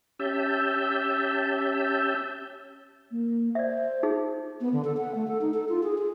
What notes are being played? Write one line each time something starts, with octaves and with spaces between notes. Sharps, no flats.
C#4 G4 E5 A5 E6 G6
A#3
C5 D5 E5
D#4 G#4
B3
D3
A4
F#5
A3
A4
D#4
A4
F4
G#4
G#4